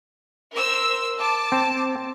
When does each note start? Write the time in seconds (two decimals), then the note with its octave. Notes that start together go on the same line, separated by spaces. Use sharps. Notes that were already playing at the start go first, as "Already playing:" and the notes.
0.52 A#4 C5 E6
1.17 A5 D6
1.52 C4